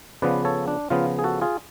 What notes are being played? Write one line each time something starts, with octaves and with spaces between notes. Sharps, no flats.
C#3 F3 B3 B4 D5
A4 C#5
D4
C#3 F3 B3 F4
G#4
F#4 A4
F4 G#4